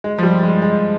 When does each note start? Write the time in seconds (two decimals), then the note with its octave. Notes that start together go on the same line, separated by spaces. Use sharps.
0.04 G#3
0.18 F3
0.23 G3
0.43 G#3
0.62 G#3